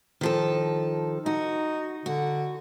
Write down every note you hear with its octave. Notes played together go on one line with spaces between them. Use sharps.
D#3 F3 A4
D#4 F#4
D3 F#4